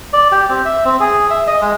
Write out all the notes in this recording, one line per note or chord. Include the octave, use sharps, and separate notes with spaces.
D5
G4
C4
E5
C4
G#4
E5
D#5
G#3